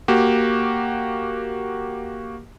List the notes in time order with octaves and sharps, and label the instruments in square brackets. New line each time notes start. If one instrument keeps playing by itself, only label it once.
[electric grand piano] A#3 F#4 G4